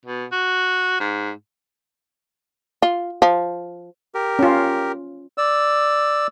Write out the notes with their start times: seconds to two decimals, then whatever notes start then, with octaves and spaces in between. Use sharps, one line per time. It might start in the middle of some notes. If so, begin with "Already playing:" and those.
0.06 B2
0.32 F#4
1.00 G#2
2.82 F4
3.22 F3
4.15 G4 A#4
4.39 C#4 F4
5.38 D5 E6